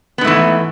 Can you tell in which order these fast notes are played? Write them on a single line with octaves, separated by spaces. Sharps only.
B3 G#2 A3 E3